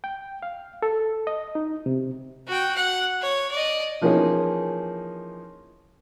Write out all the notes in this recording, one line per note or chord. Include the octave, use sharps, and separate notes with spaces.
G5
F5
A4
D#5
D#4
C3
F#4 G5
F#5
C#5
D5 D#5
E3 F3 A#3 C#4 D#4 G#4